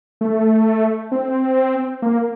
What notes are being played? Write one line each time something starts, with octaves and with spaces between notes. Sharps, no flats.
A3
C4
A#3